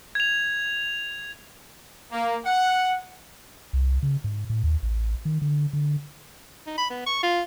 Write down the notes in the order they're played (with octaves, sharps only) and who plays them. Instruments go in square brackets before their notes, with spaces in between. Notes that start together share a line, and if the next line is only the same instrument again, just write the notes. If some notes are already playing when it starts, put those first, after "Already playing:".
[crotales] G#6 F7
[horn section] A#3
F#5
[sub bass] C2
C#3
G#2
A2
D#2
A1
D#3
D3
D3
[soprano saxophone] D#4
B5
B3
C#6
F4